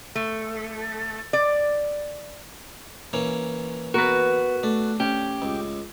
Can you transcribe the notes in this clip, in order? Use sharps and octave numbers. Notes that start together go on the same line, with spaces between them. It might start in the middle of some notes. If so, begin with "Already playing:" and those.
A3
D5
E3 A#3 C#4
B3 F#4 A#4 B4
A3 D4
C#4 G4
C#2